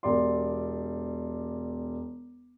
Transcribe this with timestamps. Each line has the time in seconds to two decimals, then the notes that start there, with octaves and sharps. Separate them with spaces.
0.03 E1 G4 D5 C6